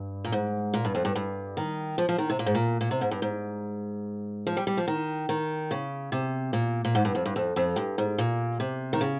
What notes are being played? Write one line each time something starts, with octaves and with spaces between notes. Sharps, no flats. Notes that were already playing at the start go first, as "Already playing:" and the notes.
Already playing: G2
A#2
G#2
A#2
G2
F2
G2
G2
D#3
F3
F3
D#3
C3
A#2
G#2
A#2
A#2
C3
G#2
G2
G#2
F3
G3
G3
F3
D#3
D#3
C#3
C3
A#2
A#2
G#2
G2
F2
G2
F2
F2
G2
G#2
A#2
C3
D#3
C#3